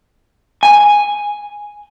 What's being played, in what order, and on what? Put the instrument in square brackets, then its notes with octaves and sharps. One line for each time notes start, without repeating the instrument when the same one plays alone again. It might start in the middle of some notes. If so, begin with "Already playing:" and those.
[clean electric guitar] G#5